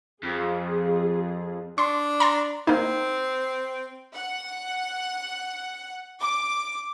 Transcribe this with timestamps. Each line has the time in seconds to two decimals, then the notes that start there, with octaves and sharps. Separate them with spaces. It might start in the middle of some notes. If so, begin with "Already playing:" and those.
0.23 F2 G#4
1.78 D4 C6
2.20 A#5 C6 A6
2.67 A#3 C4 D#4
4.14 F#5
6.21 D6